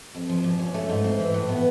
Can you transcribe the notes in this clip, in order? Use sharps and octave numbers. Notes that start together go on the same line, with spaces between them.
F2
F3
A#2
C#4
A3
G#2
C4
E3
A2
B3